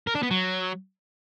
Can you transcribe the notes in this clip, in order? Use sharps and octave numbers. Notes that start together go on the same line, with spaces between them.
A#4
D4
B3
F#3